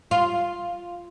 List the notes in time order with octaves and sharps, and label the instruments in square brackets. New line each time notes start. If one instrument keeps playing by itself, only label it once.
[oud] F4